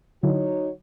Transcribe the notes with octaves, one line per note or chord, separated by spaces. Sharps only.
D3 F#3 D#4 E4 F#4 C#5